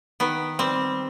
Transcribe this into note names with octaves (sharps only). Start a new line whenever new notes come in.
D#3 B3
G3 C4